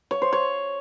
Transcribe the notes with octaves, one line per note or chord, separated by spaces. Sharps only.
C#5
C5
C#5